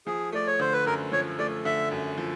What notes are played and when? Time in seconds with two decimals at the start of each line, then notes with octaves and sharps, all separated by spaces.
0.06 F3 G#4
0.32 A3 D5
0.47 C#5
0.60 D3 C5
0.73 B4
0.86 F#2 A#4
1.12 F3 C#5
1.39 A3 D5
1.65 D3 E5
1.91 F#2
2.18 F3